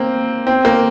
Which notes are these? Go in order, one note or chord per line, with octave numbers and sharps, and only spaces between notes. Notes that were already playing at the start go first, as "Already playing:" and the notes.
Already playing: A#3 C4
C4
A#3